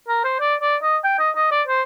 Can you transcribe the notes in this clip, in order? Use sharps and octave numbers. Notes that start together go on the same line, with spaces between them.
A#4
C5
D5
D5
D#5
G5
D#5
D#5
D5
C5